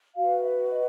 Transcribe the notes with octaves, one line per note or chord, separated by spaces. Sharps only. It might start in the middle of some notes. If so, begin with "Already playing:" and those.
F#4 B4 F5
E5
D#5